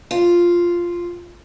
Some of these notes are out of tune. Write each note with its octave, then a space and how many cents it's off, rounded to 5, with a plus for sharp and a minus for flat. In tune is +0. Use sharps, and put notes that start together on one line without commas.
F4 -5